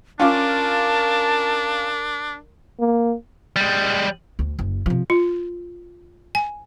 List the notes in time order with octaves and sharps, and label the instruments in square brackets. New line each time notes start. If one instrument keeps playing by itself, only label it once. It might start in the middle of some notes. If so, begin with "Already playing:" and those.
[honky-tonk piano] C#4 F4 D6 [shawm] D4 [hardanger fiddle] A#4 [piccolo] A5
[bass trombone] A#3
[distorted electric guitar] G3 G#3
[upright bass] D2
F#1
C3 F3
[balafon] F4
G#5